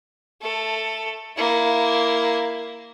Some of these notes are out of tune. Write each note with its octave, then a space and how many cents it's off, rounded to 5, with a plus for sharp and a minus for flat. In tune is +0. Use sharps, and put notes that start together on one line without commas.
A3 +0 A4 +10
A#3 +0 E4 +5